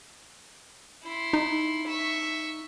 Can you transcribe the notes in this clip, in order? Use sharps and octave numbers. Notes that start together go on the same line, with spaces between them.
E4 C6
D#4
E5 C#6